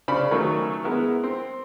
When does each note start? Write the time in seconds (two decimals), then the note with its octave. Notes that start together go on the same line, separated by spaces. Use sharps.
0.08 C#3 C#4 C5 D5 B5
0.31 D#3 F#3 A3 C#4
0.83 G#3 B3 E4 A#4
1.24 C4